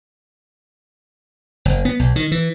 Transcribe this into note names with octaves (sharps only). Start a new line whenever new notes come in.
F#1
B3
B1
D#3
E3